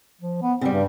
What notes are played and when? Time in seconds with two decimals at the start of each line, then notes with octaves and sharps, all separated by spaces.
0.21 F3
0.42 B3
0.61 C#3 G3 C4
0.74 G2